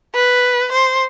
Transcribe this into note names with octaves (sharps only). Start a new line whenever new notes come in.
B4
C5